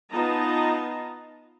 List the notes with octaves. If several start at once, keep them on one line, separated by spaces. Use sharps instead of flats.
B3 D#4 F4 D#5 A5 A#5